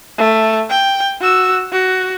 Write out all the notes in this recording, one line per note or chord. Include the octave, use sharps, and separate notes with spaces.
A3
G5
F#4 E6
F#4